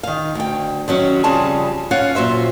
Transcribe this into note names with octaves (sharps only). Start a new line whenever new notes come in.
D#3 F5
D2 G5
D#3 F#3 C#4
F2 C#3 G3 F4 G#4 A5
C#4 F4 F5 F#5
A#2 F#3 C5 E5